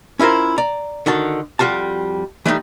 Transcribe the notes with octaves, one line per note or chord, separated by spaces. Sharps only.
C#4 E4 F4 A#4 C5
D5 A#5
D3 D#3 F#4 A5
F2 G3 F4 F#4 A5
E3 G3 A3 C4 D#4